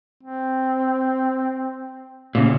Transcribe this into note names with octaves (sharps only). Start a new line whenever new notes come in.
C4
A#2 C#3